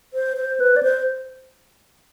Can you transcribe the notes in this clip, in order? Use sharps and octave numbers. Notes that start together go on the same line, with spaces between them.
C5
C5
B4
D5
C5